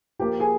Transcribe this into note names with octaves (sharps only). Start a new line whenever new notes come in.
F3 A#3 F4 G4 G5
G#4 G#5